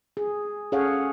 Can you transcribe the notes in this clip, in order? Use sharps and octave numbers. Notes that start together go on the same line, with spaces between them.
G#4
C#4 G#4 A4 C#5 F5 F#5